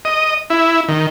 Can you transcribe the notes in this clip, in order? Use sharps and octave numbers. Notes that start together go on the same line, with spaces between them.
D#5
E4
D#3